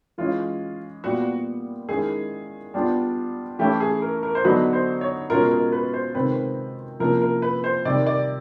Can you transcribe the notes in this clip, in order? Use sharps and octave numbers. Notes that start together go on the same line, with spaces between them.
E3 G#3 C#4 F4
A#2 G3 B3 F#4
D#3 G#3 C#4 E4 G#4
G3 B3 D4 F4
E3 A3 C#4 E4 G4
G#4
A#4
A#4
C5
D3 F#3 B3 D#4 F#4 B4
C5
C#5
B2 G#3 C#4 F4 A#4
A#4
B4
C5
C3 D#3 G#3 C4 B4
C3 F3 A#3 C#4 E4 A#4
A#4
B4
C5
C3 D#3 G3 D5
D5